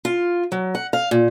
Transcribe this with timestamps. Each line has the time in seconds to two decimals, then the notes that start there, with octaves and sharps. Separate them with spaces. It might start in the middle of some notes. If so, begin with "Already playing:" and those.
0.05 F4
0.52 F#3
0.75 F#5
0.93 F5
1.11 A#2